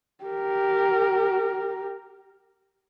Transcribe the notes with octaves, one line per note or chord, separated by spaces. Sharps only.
G4 A#4